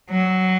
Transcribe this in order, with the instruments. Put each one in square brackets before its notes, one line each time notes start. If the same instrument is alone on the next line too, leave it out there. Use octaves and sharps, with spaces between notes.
[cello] F#3